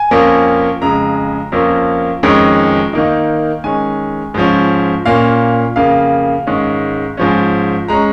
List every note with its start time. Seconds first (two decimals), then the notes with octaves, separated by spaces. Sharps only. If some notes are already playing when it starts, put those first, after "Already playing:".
Already playing: G#5
0.11 F2 F3 A#3 C#4
0.81 F2 C#3 G#3 A#5
1.52 F2 F3 A#3 C#4
2.23 F2 D#3 G#3 C#4
2.93 D#3 A#3 D#4
3.64 D#3 G#3 C#4 G#5
4.34 G#2 F3 C#4
5.06 A#2 A#3 C#4 F5
5.76 F2 C#3 A#3 F5
6.47 G#2 D#3 G#3 C#4
7.17 G#2 F3 C#4
7.88 G#3 C#4 A#5